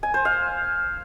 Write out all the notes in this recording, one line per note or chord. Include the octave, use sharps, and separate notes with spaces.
G#5
C5
F5